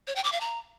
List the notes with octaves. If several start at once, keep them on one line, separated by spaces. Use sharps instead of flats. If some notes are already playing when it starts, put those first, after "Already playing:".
C#5
G5
D6
F5
A#5